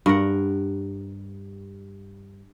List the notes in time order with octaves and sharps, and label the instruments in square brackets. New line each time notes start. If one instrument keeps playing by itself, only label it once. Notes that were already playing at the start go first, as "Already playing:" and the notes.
[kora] G2 A#4 F#5